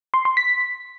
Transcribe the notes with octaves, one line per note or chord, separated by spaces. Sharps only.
C6
C6
B6